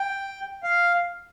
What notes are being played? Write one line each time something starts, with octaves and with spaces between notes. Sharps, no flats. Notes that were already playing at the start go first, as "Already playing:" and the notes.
Already playing: G5
F5